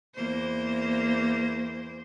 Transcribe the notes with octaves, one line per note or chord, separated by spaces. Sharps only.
E2 A#3 C5